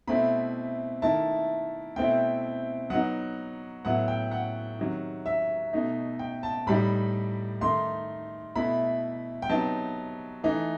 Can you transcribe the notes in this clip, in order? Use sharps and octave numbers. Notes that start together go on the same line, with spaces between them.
B2 A3 C4 E4 B5
D#3 A3 E4 A5
B2 A3 C4 E4 G5
F#3 B3 D#4 F#5
A2 F#3 B3 E4 F#5
G5
F#5
C3 D#3 F#3
E5
B2 A3 D#4
G5
A5
A2 G3 D#4 B5
D#3 A3 D#4 C6
B2 A3 E4 B5
G5
C3 F#3 B3 D#4 A5
E3 A3 D#4